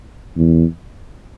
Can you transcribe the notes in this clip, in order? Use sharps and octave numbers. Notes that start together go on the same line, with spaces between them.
E2